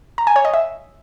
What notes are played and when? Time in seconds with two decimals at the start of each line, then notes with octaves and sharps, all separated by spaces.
0.18 A#5
0.27 G#5
0.36 C#5
0.45 D#5
0.54 E5